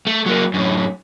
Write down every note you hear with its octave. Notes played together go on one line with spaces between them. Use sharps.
A3
F#3 A#3
F#2 A2